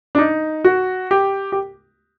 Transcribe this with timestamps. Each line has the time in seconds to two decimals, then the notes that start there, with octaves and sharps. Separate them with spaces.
0.15 D4
0.18 D#4
0.64 F#4
1.11 G4
1.52 G4